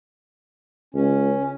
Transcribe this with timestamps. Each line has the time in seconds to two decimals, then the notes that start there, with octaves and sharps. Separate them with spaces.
0.95 C#2 C#4